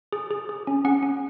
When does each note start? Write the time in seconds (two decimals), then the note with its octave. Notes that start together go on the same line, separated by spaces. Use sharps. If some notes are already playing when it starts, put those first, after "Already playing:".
0.12 G#4
0.31 G#4
0.49 G#4
0.67 C#4
0.85 C#4 F#5
1.03 C#4